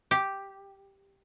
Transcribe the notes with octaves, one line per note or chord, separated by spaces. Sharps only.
G4